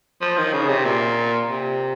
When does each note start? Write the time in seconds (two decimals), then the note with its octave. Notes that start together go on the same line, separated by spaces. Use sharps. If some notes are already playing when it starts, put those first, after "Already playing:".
0.21 F3
0.37 D#3
0.53 C#3
0.68 C3
0.85 A#2
1.48 C3